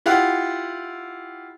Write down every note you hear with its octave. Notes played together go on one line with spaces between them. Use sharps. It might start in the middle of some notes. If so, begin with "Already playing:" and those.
E4 F4 G4 F#5